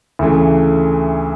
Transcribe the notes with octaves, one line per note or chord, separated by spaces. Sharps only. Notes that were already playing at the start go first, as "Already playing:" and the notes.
D2 C#3 E3 A3